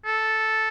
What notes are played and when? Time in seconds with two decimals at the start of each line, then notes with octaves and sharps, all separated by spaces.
0.06 A4